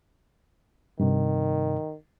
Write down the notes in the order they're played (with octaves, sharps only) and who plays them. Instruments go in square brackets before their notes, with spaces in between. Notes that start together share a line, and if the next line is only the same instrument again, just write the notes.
[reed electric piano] G2 C3 [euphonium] D#3